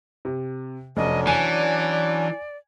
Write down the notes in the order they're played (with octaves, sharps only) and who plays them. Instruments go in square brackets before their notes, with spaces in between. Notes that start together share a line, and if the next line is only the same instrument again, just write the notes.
[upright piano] C3
[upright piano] F1 [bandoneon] F#3 C#4 D4 [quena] D#5
[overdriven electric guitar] E3 [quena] D5 [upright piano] G#5